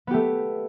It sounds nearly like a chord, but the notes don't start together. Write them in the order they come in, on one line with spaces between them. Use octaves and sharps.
B3 G4 A3